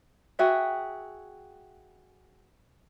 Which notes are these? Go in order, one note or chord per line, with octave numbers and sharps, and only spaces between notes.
F#4 G#4 E5 G5